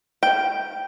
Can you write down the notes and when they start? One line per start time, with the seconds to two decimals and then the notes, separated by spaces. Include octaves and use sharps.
0.23 G5